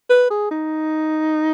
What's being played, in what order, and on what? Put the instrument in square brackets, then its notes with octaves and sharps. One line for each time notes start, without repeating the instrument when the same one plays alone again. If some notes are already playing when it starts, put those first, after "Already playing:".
[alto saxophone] B4
G#4
D#4